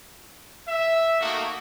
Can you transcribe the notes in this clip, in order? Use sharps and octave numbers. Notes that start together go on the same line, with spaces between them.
E5
A3 A#3 D#4 F#4